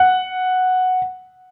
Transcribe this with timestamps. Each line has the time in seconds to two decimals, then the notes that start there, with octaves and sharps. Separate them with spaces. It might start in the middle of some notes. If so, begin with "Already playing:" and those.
Already playing: F#5